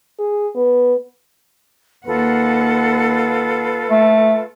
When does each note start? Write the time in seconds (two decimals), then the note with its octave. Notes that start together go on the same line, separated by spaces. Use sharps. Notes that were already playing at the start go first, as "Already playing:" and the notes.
0.19 G#4
0.55 B3
2.06 D#2 F4 A4 B4 F#5
3.90 A3